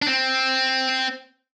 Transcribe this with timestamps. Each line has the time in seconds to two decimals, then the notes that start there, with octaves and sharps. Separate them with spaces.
0.02 D4
0.07 C4